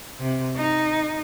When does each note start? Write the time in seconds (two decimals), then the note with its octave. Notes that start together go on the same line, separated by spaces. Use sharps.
0.20 C3
0.56 D#4